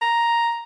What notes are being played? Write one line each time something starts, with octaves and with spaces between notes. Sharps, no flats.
A#5